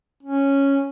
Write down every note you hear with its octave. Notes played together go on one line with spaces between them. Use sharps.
C#4